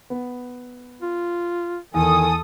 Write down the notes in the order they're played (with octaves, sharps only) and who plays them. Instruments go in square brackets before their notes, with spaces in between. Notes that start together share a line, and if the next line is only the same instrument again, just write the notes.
[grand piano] B3
[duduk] F4
[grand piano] E2 [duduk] D#3 [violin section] A4 D#6 [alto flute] G#5